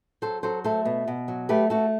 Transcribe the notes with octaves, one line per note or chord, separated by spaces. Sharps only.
F#3 A4 C5
F#3 A4 C5
A3 A4 C5
B2
B2
F#3
A3 G4 B4
A3 F#4 A4